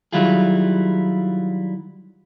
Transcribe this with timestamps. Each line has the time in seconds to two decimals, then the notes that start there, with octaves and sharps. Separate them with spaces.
0.13 D#3 F#3 G3 E4 F4 G#4